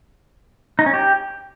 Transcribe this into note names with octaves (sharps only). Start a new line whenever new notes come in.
D#4
C#4
G4